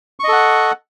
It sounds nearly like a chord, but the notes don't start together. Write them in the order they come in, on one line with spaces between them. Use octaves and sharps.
C#6 D#5 A4 F#5